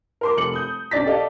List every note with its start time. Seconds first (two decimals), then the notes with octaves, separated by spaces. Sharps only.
0.21 A#4 C6 D6
0.37 F1 C#7 F#7
0.54 D#6 G6
0.91 B1 C#4 D4 D5 A6 B6
1.06 G4 A4 D5 D#5 F5